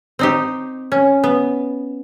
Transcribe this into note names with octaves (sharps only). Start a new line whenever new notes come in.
C4 D#4 G4
C#4
B3